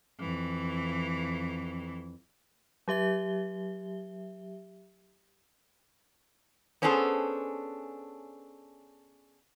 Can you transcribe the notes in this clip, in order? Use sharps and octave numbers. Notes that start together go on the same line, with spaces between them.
F2 E3
F#3 G4 E5 G7
B3 C#4 D4 G#4 A4 C5